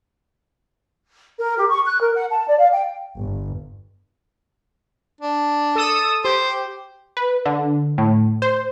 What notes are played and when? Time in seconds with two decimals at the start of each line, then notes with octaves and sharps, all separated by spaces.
1.39 A#4
1.56 G4
1.70 C#6
1.86 F#6
2.00 A#4
2.14 F#5
2.30 A5
2.47 D5
2.58 F5
2.72 G5
3.21 G1
5.21 D4
5.75 A4 D#6 E6
6.24 G4 C5
7.17 B4
7.45 D3
7.98 A2
8.42 C5